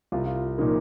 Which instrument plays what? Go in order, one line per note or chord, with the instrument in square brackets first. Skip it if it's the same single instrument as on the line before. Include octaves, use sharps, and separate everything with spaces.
[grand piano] C2 [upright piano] F4
[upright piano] F4
[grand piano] A#2 F3 A#3 [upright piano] D#4